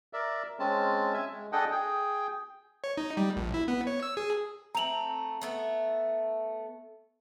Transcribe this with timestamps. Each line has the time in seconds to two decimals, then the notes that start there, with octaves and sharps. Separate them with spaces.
0.13 A#4 D5 E5
0.59 G#3 C4 C#4 A5
1.14 E5 G#5
1.31 G#3
1.52 D4 G#4 A4 D#5 F#5 G5
1.72 G#4 G5
2.84 C#5
2.97 D#4
3.17 G3
3.36 A#1
3.54 E4
3.68 B3
3.87 C#5
4.03 E6
4.17 G#4
4.75 A3 C4 A#5 F7 F#7
5.41 A3 B3 E5